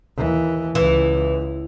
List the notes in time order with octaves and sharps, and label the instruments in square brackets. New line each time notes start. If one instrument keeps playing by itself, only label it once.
[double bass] D#2 E3
[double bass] C#2 [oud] E3